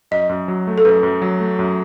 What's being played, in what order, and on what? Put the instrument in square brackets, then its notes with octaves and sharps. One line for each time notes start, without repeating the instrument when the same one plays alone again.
[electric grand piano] F#2 [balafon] D#5
[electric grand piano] F#2
F#3
A3
[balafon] A4
[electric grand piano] F#2 [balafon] B4
[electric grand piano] F#2
F#3
A3
F#2